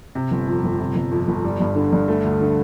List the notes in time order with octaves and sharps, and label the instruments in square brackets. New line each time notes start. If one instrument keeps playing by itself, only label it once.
[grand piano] C3
G1
F2
G1
C3
G1
F2
G1
G3
G2
D3
G2
A3
D2
D3